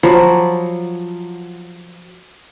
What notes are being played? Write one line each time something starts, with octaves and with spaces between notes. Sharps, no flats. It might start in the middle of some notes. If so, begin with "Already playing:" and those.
F3 F#3 B5